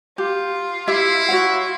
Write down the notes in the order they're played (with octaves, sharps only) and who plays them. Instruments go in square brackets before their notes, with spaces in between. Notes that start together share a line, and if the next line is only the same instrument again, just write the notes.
[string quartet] F4 [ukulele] G4
[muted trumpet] E4 [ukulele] G4 E5
[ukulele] F#4 C#5 F#5